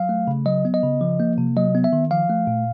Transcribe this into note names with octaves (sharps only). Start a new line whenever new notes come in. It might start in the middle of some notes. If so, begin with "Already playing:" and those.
Already playing: F#3 F5
A3
C#3
F#3 D#5
B3
D#5
C#3
F3
A#3
C3
F#3 D#5
B3
E5
D#3
F3 F5
A3
A#2